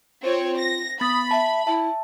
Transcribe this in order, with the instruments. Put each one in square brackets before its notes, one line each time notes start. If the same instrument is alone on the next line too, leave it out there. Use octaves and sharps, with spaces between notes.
[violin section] C4 C#5 [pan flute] F4
[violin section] A#6
[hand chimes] B3 A6 [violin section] B5 [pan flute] D#6
[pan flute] E5 [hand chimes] A5
[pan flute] E4 [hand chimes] E5 A5